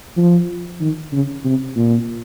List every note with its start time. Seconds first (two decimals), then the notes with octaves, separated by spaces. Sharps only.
0.17 F3
0.81 D#3
1.13 C#3
1.45 C3
1.76 A#2